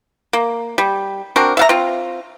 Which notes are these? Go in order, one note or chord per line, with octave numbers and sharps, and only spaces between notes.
A#3
G3
C4 D4 F#4 A#4
E5 F5 A#5
C4 F4